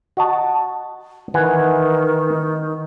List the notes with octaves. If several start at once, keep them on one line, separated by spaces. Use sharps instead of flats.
F#4 D#5 A5
D#3 E3 F#5 G#5